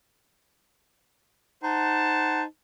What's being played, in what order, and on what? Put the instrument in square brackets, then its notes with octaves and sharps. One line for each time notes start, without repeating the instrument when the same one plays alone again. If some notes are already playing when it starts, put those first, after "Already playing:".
[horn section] D#4 C5 F#5 A5